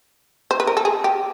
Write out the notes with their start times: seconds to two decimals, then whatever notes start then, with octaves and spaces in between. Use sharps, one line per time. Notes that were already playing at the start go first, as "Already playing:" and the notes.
0.51 C5
0.60 B4
0.67 A#4
0.77 A4
0.85 G#4
1.04 G4